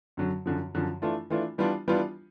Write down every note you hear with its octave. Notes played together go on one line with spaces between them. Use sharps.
F#2 D3 F#3
F#2 D3 F3
F#2 D3 F3
E3 A3 D4 F4
E3 A3 D4 F4
E3 G3 B3 D4 F4
E3 G3 B3 D4 F4